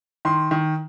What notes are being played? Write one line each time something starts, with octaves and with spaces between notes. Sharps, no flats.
D#3 C6
D#3